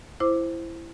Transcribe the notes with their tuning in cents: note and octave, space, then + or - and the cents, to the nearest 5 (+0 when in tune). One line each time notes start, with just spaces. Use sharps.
E4 +15 C5 +0 D6 +0